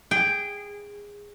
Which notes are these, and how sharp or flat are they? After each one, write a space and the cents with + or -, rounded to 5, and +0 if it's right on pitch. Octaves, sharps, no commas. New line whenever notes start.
G#4 -20 G5 +0